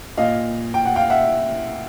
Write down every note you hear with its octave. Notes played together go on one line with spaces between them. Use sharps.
A#2 D#5 F5
G5
F#5
F5 G5
E5 F#5